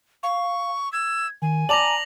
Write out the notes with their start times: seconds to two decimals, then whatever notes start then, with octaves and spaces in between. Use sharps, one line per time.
0.23 F5 C#6
0.93 E6 G#6
1.42 D#3 G#5
1.69 D5 A5 A#5 D6 A#6 F7 F#7